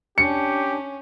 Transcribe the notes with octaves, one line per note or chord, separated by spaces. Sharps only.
C#4 D4 G4 C#7